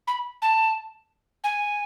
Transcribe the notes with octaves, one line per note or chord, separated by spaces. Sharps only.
B5
A5
G#5